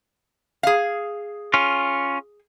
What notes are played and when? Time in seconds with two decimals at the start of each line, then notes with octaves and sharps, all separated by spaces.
0.63 G#4 F5
1.54 C#4 F4